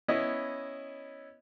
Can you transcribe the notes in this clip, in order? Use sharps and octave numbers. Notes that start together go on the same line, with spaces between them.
B3 C#4 E4 D#5